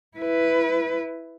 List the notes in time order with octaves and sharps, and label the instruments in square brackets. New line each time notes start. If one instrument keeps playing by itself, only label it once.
[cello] E4 B4